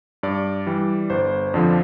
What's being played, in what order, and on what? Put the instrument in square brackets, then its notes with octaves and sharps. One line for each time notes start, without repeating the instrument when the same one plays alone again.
[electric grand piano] G2 D5
E3 G3
G1 C5
F2 D3 F3 D5